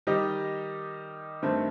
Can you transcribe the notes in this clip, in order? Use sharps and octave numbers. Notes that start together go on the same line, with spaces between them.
D#3 G3 D#4 G4 D#5
G2 D#3 A3 C4